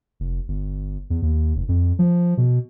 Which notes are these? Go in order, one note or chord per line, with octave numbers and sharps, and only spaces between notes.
F1
G1
E2
D#2
F1
F2
F3
B2